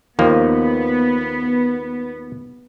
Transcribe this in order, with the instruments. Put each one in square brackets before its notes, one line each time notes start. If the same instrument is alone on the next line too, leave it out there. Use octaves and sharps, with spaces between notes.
[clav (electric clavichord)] D#2 F3 A#3 [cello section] B3